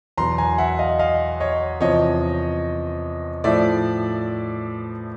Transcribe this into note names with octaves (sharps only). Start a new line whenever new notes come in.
E2 B2 F#3 A#5 C6
G#5 A#5
E5 F#5
D#5 F5
D#5 F5
C#5 D#5
E2 C3 F3 C#5 D#5
A2 F3 D5 E5